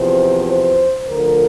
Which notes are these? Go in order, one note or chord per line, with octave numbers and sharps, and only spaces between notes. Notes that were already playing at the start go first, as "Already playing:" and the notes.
Already playing: E2 C3 F3 C5
C5
D2 D3 F3 A#4